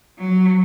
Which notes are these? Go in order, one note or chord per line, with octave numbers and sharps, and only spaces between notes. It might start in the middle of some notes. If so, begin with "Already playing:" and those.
F#3